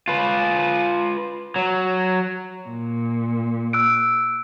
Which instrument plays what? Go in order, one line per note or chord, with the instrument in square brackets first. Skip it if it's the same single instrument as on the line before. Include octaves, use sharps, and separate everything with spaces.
[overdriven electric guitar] F4 B4
F#3
[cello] A#2
[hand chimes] E6 F#6 D7